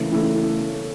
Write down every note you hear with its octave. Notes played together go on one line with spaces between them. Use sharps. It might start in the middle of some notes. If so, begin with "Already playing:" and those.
Already playing: C#3 E3 A3
C#3 E3 A3